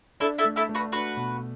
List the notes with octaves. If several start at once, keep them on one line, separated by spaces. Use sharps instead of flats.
D4 E4 A4
E4 A4
A3
E4 A4
A3
F#4 B4
D4 F#4 B4
B2